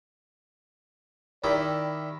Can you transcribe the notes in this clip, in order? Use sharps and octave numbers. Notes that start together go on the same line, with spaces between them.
D#3 E4 G4 D5